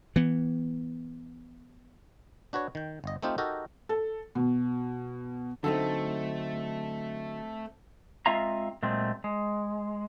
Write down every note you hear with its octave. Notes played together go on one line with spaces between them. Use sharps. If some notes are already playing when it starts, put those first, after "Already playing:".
E3 B3
D4 F#4 B4 C#5
D#3 G5
G1 D#5
A3 C4 D#4 F4 G4
D#4 F#4 G4 A4 A#4
A4
B2
D3 F#3 A3 C4 D#4 A4
G#3 C4 F4 E5 F5 A#5
A#2 F#3 G#3 A3 C4
G#3